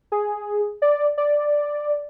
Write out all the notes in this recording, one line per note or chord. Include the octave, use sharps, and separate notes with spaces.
G#4
D5
D5